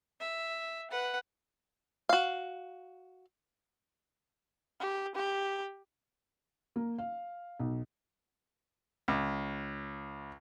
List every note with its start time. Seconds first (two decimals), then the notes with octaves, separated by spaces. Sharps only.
0.20 E5
0.91 B4 F#5
2.09 F#4 F5
4.80 G4
5.15 G4
6.76 A#3
6.98 F5
7.59 B1
9.08 C#2